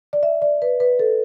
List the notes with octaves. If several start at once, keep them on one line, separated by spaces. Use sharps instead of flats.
D5
E5
D5
B4
B4
A4